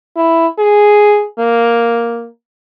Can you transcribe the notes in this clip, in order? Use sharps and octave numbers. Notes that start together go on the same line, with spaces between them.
E4
G#4
A#3